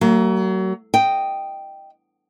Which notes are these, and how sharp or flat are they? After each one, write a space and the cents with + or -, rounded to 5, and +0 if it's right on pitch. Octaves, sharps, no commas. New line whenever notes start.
F#3 +30 A#3 -40
D#5 -5 G5 +0